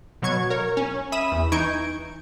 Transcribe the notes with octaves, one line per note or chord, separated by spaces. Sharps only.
B2 F#3 C#6 G#6
A#4 C#5
C#4
E5 B5 D#6 D#7 E7
E2
E3 D#4 C#6 G6 G#6 D7